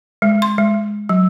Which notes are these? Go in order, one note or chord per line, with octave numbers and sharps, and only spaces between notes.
G#3
C6
G#3
F#3